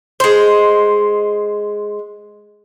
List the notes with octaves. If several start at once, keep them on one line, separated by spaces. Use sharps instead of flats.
G#3 C5